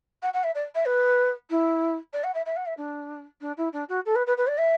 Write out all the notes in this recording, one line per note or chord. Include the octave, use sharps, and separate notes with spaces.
F#5
F#5
E5
D5
E5
B4
E4
D5
F#5
E5
E5
F#5
E5
D4
D4
E4
D4
F#4
A4
B4
B4
B4
D5
E5